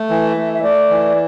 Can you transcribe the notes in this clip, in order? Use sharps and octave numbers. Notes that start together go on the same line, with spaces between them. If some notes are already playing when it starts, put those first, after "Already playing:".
Already playing: A3
E3
E5
A3
E5
A3 D5
E3